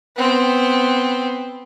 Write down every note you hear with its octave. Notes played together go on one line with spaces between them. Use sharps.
B3 C4